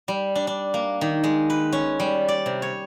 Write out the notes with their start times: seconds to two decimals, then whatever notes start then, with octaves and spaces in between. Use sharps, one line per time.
0.08 G3
0.35 D4
0.47 D4
0.74 A#3
1.01 D#3
1.24 G#3
1.50 B4
1.73 C#4
2.00 G3
2.28 D5
2.46 C3
2.62 C#5